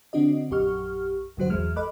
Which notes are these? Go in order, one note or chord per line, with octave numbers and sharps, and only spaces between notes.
D3 C4 D4 F#4 D#5
A#1 F#2 G4 C#6 F6
A#1 G2 D3 F#3 F#4 C5
G#1 E2 G#3 F6
A4 D#5 B5 D6 F#6